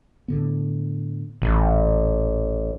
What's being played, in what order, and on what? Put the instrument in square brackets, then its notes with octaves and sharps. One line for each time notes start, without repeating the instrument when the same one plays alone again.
[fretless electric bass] A2 D3 B3
[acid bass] A1 [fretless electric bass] A#2 E3